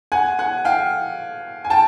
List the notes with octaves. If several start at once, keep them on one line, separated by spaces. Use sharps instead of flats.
F#5 G#5
F#5 G#5
F5 G5
G#5
G5 A5